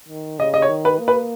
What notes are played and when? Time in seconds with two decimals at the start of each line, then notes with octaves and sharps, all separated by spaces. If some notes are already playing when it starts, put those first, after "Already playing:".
0.09 D#3
0.39 C#3 D#5
0.54 D#5
0.62 C#5
0.69 D#3
0.85 B4
0.99 A#3
1.08 B4